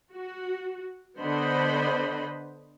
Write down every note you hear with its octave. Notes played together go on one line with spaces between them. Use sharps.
F#4
D3 B3 C5 D#5 B5